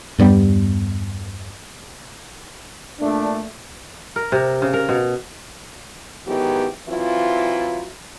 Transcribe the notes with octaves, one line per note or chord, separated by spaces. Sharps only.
E2 G2 G3 B3
A#2 A3 D4
A#4
C3
C#3
A#4
B2
G#2 D#3 E3 F#3 B3 G4
E3 F#3 C4 E4 F4